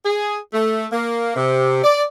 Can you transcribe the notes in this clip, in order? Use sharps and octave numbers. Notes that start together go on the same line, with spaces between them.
G#4
A3
A#3
C3
D5